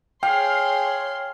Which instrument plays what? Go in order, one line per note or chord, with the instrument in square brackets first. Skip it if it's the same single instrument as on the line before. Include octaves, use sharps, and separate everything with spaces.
[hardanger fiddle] G#4 [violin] C#5 C6 [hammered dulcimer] F5 [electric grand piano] G5